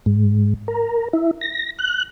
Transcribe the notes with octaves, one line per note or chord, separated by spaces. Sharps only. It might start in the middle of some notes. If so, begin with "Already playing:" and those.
G#2
A#4
E4
A#6
F#6